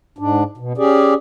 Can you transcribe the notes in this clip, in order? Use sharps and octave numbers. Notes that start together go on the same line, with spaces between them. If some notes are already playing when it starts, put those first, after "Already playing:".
G#2 D4
B2
C#4 G4 G#4 D5